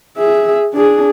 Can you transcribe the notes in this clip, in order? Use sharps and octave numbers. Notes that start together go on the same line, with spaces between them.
G#4 E5
D4 G#4